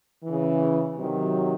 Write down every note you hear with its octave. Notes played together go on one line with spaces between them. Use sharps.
C#3 E3
C3 D#3 F#3